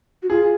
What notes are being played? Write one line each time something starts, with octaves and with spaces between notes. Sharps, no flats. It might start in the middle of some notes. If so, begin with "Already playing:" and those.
F#4
F4 G#4